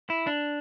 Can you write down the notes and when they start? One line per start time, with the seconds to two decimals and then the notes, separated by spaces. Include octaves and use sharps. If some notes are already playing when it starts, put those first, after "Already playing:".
0.10 E4
0.27 D4